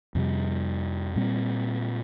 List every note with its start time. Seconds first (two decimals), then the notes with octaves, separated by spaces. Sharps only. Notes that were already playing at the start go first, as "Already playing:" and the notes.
0.15 F2 C3 G3
1.16 A#2 G3 C4